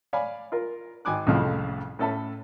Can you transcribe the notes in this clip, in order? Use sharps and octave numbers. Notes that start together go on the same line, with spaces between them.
C#5 D5 F5 G#5 B5
F4 A#4
G#1 G#5 D6 F#6
C2 F2 A2 C#3 F3
A2 C#4 A4 E5 A5 B5